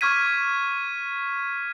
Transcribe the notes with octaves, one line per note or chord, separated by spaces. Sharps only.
C#6 D6 F6 G#6 B6 D#7